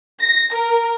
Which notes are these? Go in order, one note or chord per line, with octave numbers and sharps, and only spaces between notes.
A#6
A#4